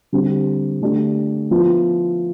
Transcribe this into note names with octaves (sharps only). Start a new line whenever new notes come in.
D3 G3 C4 G4
D3 A3 D4 G4
F3 B3 E4